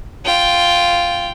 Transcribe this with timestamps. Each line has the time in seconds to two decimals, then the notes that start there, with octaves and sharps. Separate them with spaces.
0.25 F4 G5